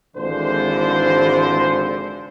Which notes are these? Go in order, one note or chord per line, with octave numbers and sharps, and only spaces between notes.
G#1 G#2 D3 E3 F3 C5